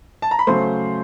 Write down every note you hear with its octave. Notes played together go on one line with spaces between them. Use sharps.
A5
A#5
B5
C#3 F#3 A3 C5 C6